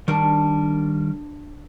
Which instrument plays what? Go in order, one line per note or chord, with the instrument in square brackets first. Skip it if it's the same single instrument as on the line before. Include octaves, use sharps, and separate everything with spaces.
[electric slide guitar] D#3 G3 A#4 [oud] D4